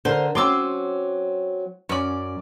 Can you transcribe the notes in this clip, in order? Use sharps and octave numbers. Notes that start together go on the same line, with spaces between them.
D3 A#4 C5
F#3 C4 C#4 C6 D6 E6
F#2 C#4 D5